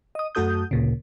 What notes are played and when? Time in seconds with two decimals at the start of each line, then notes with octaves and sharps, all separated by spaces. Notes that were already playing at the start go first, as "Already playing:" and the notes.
0.15 D#5 D#6
0.35 F#2 A3 F#4 A4 D#6 G6
0.71 D2 A#2 C#3